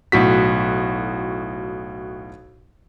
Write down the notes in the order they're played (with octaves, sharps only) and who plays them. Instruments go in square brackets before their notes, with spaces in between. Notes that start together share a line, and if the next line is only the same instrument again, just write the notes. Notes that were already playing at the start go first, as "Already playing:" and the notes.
[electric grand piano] B1 A2 F#4 B6